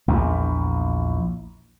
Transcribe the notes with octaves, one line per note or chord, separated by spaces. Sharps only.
A#1 E2